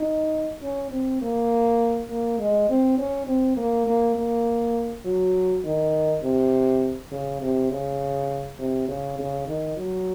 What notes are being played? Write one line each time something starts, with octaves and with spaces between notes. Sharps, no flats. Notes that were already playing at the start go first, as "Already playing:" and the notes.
Already playing: D#4
C#4
C4
A#3
A#3
G#3
C4
C#4
C4
A#3
A#3
A#3
F#3
D#3
C3
C#3
C3
C#3
C3
C#3
C#3
D#3
F#3